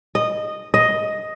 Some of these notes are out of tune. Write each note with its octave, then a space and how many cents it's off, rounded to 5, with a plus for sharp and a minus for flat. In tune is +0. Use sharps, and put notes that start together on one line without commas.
D#5 -15
D#5 +5